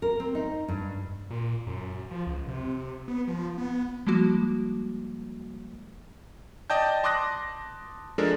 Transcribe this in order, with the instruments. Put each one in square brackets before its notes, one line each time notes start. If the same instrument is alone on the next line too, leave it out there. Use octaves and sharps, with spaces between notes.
[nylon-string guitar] A#4
C4
D#4
G2
[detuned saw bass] A#2
F#2
F3
C#2
C3
B3
F3
B3
[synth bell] F3 G3 G#3 A#3 F#4
[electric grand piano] D5 D#5 G5 A5 G6
A5 C6 D6 D#6 F#6 A#6
F3 G#3 D4 A4 A#4